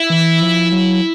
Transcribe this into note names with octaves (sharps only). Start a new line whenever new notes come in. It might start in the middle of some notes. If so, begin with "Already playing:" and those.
Already playing: E4
E3
F3
F#3